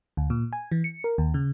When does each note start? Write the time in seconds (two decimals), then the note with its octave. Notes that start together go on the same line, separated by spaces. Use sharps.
0.17 D2
0.30 A#2
0.53 G#5
0.72 E3
0.84 C#7
1.04 A#4
1.18 D#2
1.34 C#3